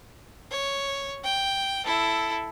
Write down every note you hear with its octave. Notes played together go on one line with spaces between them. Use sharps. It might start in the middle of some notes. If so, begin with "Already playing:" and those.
C#5
G5
E4 A4